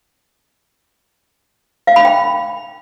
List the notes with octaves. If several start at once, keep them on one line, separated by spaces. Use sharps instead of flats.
F5
B5
G5